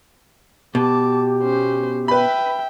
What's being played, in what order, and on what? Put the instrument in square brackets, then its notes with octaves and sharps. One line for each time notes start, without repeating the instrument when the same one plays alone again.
[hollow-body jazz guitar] B2 [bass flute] G4 [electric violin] A5 D6
[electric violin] C#4 C5
[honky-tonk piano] B4 B5 [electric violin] E5 G5